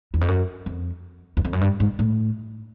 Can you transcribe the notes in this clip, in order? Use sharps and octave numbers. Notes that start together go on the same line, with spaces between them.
E2
F2
F#2
F2
E2
F2
F#2
G2
G#2
A2